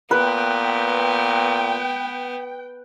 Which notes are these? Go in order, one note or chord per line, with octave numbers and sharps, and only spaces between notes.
A#2 B3 B4 G5